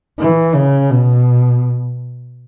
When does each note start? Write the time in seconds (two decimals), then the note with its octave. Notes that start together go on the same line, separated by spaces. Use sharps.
0.19 E3
0.55 C#3
0.90 B2